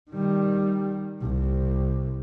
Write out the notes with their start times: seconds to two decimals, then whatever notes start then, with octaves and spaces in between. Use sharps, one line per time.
0.10 D#3 G3
1.21 C2